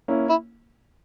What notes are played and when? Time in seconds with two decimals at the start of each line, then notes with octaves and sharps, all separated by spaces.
0.08 A#3 C#4 E4
0.29 E4